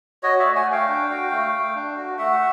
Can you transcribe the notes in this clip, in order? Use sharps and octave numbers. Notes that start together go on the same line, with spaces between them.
F#4 C#5 D#5
D5 E5
A3
F#5 G#5
A3
F5 G5
D4
F#4
A3
A3
D4
F#4
A3 E5 F#5